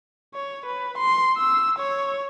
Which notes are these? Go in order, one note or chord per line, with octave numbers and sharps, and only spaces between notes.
C#5
B4
C6
E6
C#5